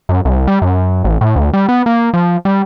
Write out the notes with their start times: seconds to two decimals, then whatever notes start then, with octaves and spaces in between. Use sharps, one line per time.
0.09 F#2
0.25 C2
0.47 G3
0.62 F#2
1.04 A1
1.21 A2
1.36 D2
1.53 G3
1.69 B3
1.86 A#3
2.14 F3
2.45 G3